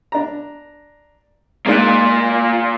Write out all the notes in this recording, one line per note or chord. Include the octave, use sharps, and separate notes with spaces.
D4 A#5
G#3 A#3 D#4 D5 F#6
F4